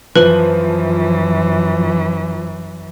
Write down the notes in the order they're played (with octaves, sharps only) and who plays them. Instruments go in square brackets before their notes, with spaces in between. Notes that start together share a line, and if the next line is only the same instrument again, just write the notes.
[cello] F#2 E3 [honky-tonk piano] F3 F#7 [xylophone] B4